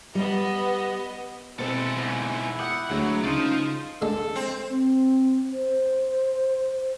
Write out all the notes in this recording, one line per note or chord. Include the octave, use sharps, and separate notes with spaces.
G3 B3 D#5
B2 G#3 C4 E4 A4
E2 G#2
F#5 D6 D#6 G6
D2 F#3 G#3
C#3 D#4 F4 C5
G#3 D4 A4
C4
C4
C5